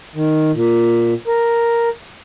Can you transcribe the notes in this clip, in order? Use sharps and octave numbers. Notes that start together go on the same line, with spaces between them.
D#3
A#2
A#4